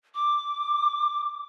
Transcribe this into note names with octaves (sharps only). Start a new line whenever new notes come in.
D6